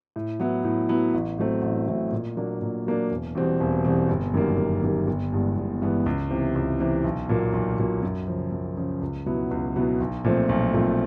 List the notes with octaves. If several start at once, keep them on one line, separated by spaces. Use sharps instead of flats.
A2
F#3 B3 E4
A2
F#3 B3 E4
A1
A2 F#3 A3 C4
A1
A2 F#3 A3 C4
A#2
F#3 A#3 D4
A#2
F#3 A#3 D4
E1
E2 B2 G3 C4
E1
E2 B2 G3 C4
G1
F#2 D#3 G3 A#3
G1
F#2 D#3 G3 A#3
G1
G2 E3 G#3 B3
G1
G2 E3 G#3 B3
C#2
C3 E3
C#2
C3 E3
B1
A#2 F#3 A#3
B1
A#2 F#3 A#3
F#2
C#3 F3
F#2
C#3 F3
C#2
B2 F#3 B3 E4
C#2
B2 F#3 B3 E4
B1
A#2 F3 A3 C4
B1
A#2 F3 A3 C4